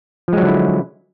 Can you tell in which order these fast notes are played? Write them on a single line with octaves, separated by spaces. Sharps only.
F3 G#3 F#3 D3 E4